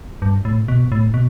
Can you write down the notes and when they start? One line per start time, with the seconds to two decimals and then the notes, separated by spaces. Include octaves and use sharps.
0.22 G2
0.45 A2
0.68 B2
0.92 A2
1.14 B2